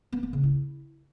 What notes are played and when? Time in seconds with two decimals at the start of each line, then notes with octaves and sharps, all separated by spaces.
0.13 B3
0.23 A#3
0.33 C#3
0.43 E4